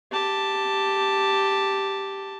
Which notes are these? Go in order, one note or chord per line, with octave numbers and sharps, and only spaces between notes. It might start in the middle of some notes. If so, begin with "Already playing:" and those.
G4 A5